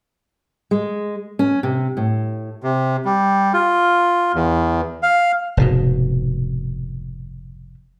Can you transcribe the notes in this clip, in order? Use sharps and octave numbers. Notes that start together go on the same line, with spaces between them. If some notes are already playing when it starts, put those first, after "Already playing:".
G#3
C#4
C3
A2
C3
G3
F4
E2
F5
F1 G#2 B2